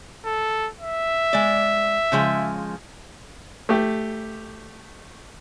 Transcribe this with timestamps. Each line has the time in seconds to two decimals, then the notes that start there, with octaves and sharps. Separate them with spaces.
0.25 A4
0.81 E5
1.33 G#3 D5
2.12 C#3 F3 G#3
3.69 A3 G4